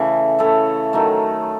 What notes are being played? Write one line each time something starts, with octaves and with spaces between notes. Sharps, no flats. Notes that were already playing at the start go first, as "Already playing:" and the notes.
Already playing: C#3 E3 A3
A3 E4 A4 C#5
D#3 F#3 A3